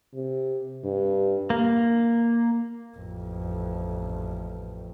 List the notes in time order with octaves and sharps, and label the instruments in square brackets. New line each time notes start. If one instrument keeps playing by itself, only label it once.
[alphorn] C3
G2
[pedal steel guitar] A#3
[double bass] A1 F2